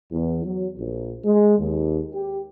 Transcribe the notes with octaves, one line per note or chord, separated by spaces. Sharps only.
E2
F#3
A#1
G#3
D#2
G4